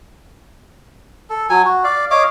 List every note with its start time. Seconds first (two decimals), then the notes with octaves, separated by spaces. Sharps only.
1.30 A4
1.50 F#3 G#5
1.65 F#4
1.84 D5 F5
2.11 C#5 D#5 F5 D6